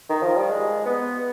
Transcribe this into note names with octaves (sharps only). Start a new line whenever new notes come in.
D#3
F3
G3
G#3
B3